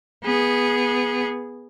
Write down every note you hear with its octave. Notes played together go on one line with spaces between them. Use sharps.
B3 G#4